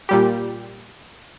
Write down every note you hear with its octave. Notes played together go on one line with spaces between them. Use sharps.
A#2 G3 G4